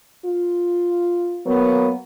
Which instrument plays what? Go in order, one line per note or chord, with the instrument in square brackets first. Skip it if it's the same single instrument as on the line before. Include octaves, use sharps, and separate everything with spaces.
[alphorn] F4
[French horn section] F#3 A#3 B3